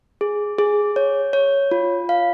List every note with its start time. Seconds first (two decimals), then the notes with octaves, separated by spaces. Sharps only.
0.21 G#4
0.59 G#4
0.96 C#5
1.33 C#5
1.71 F4
2.09 F5